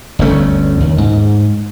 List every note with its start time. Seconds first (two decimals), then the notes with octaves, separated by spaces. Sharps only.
0.19 G1 D2 A3 C#4
0.80 D#2
0.98 G#2